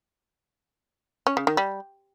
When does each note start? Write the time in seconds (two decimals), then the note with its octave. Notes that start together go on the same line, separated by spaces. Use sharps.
1.27 C#4
1.37 C#3
1.47 D#3
1.57 G3